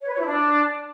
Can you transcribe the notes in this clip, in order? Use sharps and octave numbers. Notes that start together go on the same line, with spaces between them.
C#5
B4
C#5
E4
D4